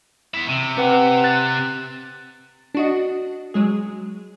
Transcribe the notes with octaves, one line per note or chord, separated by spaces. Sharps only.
B3 E4
C3
C4 B4 F#5
F#6 A6
D4 F#4 D#5
F#3 G#3 G#4